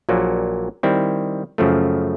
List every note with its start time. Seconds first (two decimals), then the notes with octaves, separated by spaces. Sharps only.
0.09 A#1 A#2 F#3 A#3
0.83 D#3 G3 C4 E4
1.58 F#2 C#3 F3 A3